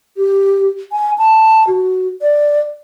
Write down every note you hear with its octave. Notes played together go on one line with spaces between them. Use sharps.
G4
G#5
A5
F#4
D5